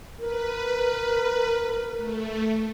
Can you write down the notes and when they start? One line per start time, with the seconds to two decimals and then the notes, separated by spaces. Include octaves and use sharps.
0.19 A#4 B4
1.97 A3